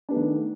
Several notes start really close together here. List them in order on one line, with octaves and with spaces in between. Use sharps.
D4 B3 A3 D#3